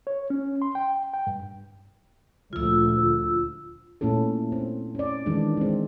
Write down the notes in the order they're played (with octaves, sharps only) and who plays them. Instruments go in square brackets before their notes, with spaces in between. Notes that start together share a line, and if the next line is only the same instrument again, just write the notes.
[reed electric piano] C#5
C#4
C6
G5
G5
G2
[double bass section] D2 A#2 F3 [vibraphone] F4 E6
[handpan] A#2 A3 C#4 E4 A4
C4
C#4 D5
D#3 E3 G#3 D4
G#3 C4